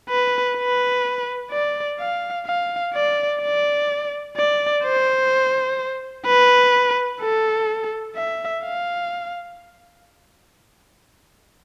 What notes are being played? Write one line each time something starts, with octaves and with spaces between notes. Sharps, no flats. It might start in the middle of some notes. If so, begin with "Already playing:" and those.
B4
B4
D5
F5
F5
D5
D5
D5
C5
B4
A4
E5
F5